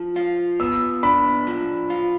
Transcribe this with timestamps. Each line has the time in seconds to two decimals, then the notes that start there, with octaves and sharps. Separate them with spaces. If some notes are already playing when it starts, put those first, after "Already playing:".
Already playing: F3
0.16 F4
0.60 B3 E6
1.03 D4 B5
1.47 F3
1.90 F4